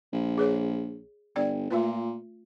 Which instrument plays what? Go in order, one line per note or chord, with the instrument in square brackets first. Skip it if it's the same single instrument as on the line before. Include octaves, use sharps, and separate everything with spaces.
[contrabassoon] A#1
[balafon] G#4 B4 C#5
[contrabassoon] G1 [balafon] D5 G5
[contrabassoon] A#2 [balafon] A3 F4 B4